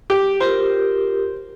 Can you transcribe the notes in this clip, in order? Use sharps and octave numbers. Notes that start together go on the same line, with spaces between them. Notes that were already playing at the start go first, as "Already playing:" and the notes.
G4
F4 G4 A#4 C5